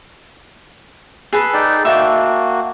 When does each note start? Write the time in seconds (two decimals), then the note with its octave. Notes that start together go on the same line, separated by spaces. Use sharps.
1.33 G#4 A4 B4
1.53 D#4 D5 G5
1.85 A#3 F#4 E5 G5 A5